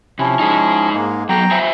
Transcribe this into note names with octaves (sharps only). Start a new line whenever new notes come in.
C3 F3 C#4 E4
D#4 G#4
G#2 G#3 A#3
F#3 B3 G5 A#5
C5 E5 G#5